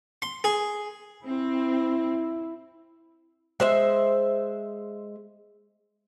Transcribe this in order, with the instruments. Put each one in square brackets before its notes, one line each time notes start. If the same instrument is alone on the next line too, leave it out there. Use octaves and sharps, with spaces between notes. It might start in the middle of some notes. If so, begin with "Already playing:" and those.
[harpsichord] C6
G#4
[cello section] C4 [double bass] E4
[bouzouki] G#3 C5 E5